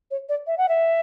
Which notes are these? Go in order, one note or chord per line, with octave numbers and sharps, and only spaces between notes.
C#5
D5
E5
F#5
E5